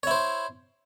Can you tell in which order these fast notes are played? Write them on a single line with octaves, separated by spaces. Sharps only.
C#5 E4 C5